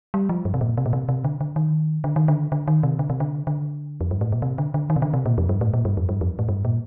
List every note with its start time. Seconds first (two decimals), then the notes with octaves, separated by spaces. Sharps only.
0.14 G3
0.29 F3
0.45 G2
0.54 C3
0.61 A#2
0.77 C3
0.86 A#2
0.93 C3
1.09 C3
1.24 D3
1.41 D3
1.56 D#3
2.04 D3
2.16 D#3
2.28 D3
2.52 D3
2.68 D#3
2.83 C3
2.99 D3
3.10 C3
3.20 D3
3.47 D3
4.01 F2
4.11 G2
4.21 A2
4.32 A#2
4.42 C3
4.58 D3
4.74 D3
4.90 D#3
4.96 C3
5.02 D3
5.14 C3
5.26 A#2
5.38 F2
5.49 G2
5.61 A2
5.74 A#2
5.85 G2
5.97 F2
6.09 G2
6.21 F2
6.39 A2
6.49 G2
6.65 A#2